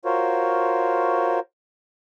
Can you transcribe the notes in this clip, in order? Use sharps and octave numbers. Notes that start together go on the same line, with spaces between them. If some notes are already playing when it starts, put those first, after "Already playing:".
F4 F#4 A#4 C5 C#5